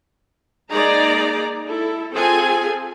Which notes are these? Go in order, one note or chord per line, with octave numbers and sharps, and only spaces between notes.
G#3 A#3 D#4 G#4 D5 A#5
E4 A4
C4 F4 G#4 A4 G#5